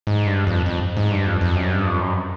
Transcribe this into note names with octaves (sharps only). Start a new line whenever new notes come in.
G#2
G2
F2
F2
G#2
G2
F2
F2
F#2
G2
F2
F#2